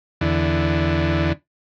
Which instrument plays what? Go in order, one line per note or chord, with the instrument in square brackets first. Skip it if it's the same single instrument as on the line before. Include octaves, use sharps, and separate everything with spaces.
[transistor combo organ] E2 D3